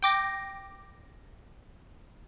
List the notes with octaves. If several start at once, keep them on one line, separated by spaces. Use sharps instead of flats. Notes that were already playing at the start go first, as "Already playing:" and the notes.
G5 D6 A#6